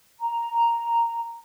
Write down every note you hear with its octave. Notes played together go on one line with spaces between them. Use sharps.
A#5